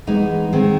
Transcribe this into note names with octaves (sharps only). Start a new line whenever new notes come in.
E3 G#3 B3 D#4
D#3 G#3 C4